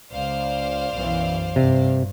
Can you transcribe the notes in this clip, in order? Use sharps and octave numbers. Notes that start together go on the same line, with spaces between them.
C#2 C5 D5 F5
B1 F#2 E3
G2 C3